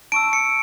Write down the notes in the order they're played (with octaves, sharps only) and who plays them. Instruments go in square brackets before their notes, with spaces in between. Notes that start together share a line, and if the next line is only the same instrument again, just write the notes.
[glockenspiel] A5 C#6 E6 D7
C#7